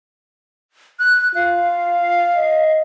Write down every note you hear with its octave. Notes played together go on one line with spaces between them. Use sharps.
F#6
F4 F5
D#5